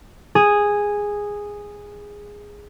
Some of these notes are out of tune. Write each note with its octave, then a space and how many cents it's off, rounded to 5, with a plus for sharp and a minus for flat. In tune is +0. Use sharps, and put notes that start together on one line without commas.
G#4 -10